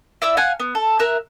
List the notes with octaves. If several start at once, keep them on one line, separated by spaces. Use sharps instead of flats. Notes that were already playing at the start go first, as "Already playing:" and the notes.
E4 D5 E5 E6
F5 F#5 G#5
B3
A4
A#4 E5 F#6